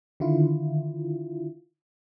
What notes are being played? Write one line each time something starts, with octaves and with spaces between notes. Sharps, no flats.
D3 D#3 E4 F4